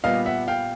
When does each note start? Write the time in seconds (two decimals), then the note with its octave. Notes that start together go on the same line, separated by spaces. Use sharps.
0.04 A#2 G3 B3 D#5 F5
0.26 E5 F#5
0.48 F5 G5